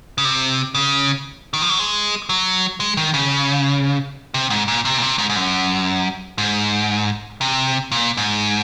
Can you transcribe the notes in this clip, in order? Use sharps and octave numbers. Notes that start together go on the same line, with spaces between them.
C#3
C3
C#3
D#3
F3
F#3
G#3
F#3
G#3
D#3
C#3
C3
G#2
A#2
C3
A#2
C3
G#2
G#2
F#2
G#2
C3
A#2
G#2